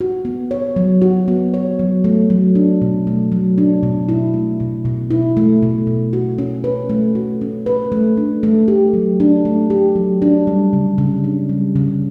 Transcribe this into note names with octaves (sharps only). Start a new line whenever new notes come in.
F#4
B3
C#5
F#3
F#4
B3
C#5
F#3
A3
F#3
D4
B2
A3
F#3
D4
B2
E4
A3
B2
B2
E4
A3
B2
B2
F#4
C#4
B4
A3
F#4
C#4
B4
A3
D4
A3
G4
F#3
D4
A3
G4
F#3
D4
G3
C#3
C#3
D4
G3
C#3